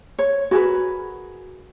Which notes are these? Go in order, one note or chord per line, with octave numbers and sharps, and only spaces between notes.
C#5
F#4 G#4 A#4 B4